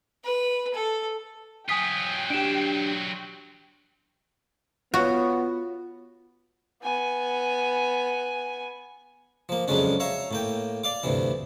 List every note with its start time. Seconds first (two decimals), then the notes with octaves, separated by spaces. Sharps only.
0.24 B4
0.74 A4
1.69 F#3 F4 G5 G#5 D#6 B6
2.30 D4 G4 D7 E7
4.94 B3 F4 F#4 C#5
6.83 B3 G#5
9.49 F3 A#3
9.68 F2 C#3 F#3 G#3 C#4 D4
10.00 C#5 E5 F5 A#5
10.31 A2 A#3 G5
10.84 D5 F5 D6
11.03 D2 G2 C3 E3